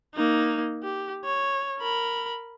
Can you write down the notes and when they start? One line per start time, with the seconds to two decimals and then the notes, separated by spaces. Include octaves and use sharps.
0.15 A#3 D#4
0.83 G4
1.25 C#5
1.79 A#4 B5